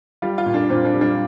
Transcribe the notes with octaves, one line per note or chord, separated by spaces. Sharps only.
G3 F4
F4
A#2
D4
A#2 C4
D4
G3
D4